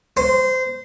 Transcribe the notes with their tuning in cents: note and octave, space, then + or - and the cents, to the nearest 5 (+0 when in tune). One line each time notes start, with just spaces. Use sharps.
C5 -20